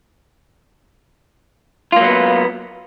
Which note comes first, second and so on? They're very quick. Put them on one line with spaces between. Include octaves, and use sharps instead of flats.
F4 A#3 F#3 B3